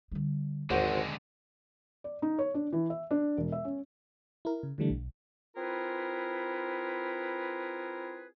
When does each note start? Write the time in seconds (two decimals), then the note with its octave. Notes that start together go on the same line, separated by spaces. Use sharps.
0.11 D3 G3
0.70 G#1 D#2 D3 G#3 F#4 C5
2.04 D5
2.22 D#4
2.39 C#5
2.54 D4
2.73 E3
2.90 E5
3.11 D4
3.37 E1
3.52 E5
3.64 C#4
4.45 E4 A#4
4.63 C#3
4.78 D3 E3 G3 A3 D4
4.90 B1
5.56 C4 E4 F4 G#4 A#4 B4